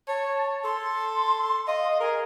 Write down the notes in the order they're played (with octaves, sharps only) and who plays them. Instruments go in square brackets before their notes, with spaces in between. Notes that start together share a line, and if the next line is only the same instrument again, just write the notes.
[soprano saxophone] C#5 [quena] A5
[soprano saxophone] A4 [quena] C6
[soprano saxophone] D#5 [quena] F5
[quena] G#4 [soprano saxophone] A#4